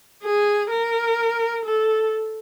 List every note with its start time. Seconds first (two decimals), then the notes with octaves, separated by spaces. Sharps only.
0.24 G#4
0.70 A#4
1.65 A4